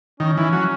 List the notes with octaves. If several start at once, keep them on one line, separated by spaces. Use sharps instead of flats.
D#3 C#4
E3
F#3